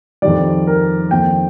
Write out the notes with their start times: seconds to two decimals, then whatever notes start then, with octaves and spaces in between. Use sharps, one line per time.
0.22 F2 D#3 G3 D5
0.67 A#4
1.11 F2 D#3 A#3 G5